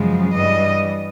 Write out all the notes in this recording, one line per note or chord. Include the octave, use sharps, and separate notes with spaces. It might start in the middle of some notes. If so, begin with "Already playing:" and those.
Already playing: F#2 C#3 F3 G#3
G2 E3 G3 D#5